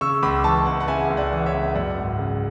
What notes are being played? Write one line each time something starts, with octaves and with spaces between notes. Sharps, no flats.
C#3 C#6 E6
C#2 B5 D6
E3 A5 C#6
C#2 F#5 A5
F#5
C#3 E5 G#5
C#2
D5 F#5
E3
C#5 E5
C#2
F#2 D5 F#5
G#1
C#3